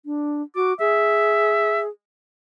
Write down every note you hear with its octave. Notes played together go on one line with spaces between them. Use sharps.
D4
F#4 D6
G#4 E5